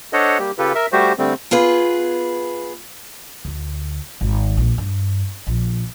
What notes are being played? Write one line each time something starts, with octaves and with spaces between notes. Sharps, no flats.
D4 A4 C5 C#5 D#5 F#5
G3 A#3 G4
C#3 F4 G4 A4 B4
A#4 E5
G3 A3 F#4 G4 C5
D3 G3 A3 C4
B3 F4 G#4 B4
D2
G#1
A#1
G2
A#1